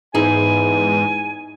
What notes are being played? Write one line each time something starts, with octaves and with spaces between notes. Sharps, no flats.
E2 G#2 D#4 E4 G#4 G#5